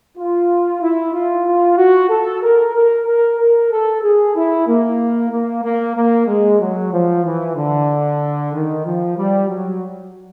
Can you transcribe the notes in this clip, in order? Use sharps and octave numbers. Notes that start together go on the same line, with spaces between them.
F4
E4
F4
F4
F#4
A4
A#4
A#4
A#4
A#4
A4
G#4
E4
A#3
A#3
A#3
A#3
G#3
F#3
F3
E3
D3
D#3
F3
G3
F#3